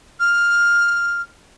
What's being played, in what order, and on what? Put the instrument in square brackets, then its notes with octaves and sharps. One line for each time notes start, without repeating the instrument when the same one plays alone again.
[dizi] F6